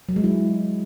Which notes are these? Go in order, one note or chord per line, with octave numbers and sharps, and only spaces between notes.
F#3
G#3
E4